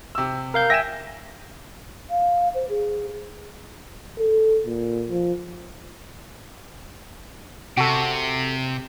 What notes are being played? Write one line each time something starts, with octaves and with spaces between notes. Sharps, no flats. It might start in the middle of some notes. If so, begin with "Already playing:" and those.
C3 E6
A#4 F5 G6
E5 G5 G#5 A#6 E7
F5
C5
G#4
A4
A#2
F3
C3 F#4 A4